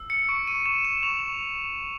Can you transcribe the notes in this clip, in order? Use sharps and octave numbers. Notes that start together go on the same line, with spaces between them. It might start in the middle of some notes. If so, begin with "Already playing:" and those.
Already playing: E6
C#7
C#6 D7
D#7
C#6 E7
E7
C#6 F7